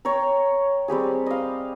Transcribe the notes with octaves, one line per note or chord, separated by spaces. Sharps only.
C#5 G5 A#5
G3 C4 G4 G#4
D#5 F5